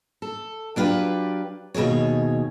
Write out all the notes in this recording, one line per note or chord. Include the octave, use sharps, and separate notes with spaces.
A4
F#3 D4 F4 G4 B4
D#2 B2 F#3 G#4 C#5